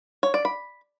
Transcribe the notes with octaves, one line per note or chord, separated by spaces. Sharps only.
C#5
D5
B5